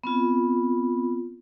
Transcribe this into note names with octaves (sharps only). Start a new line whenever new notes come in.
B3 C4 F4